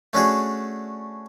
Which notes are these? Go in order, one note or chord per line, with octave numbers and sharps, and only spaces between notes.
A3 C#4 D4 F#4 G#4